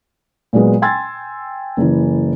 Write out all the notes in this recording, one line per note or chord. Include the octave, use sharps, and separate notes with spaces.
A#2 F#3 G#3 B3
G5 G#5 C6 E6 G#6 A6
F#1 E3